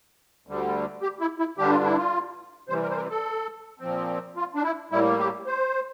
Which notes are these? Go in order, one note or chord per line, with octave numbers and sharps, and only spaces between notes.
D2 D3 G3
G4
E4
E4
G2 D3 G3 D4 G4
F4
E4
F4
C3 E3 G3 C5
A#4
C5
A#4
A4
A#2 F3 C4
F4
D4
E4
A2 G3 A#3 E4
G4
C5